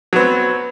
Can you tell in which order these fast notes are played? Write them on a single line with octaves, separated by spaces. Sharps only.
F#3 B3 C4